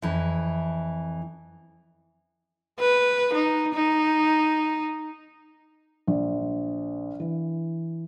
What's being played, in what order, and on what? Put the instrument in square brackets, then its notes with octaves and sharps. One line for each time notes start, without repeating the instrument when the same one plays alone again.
[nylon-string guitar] F2 E3
[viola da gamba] B4
D#4
D#4
[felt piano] A#1
E3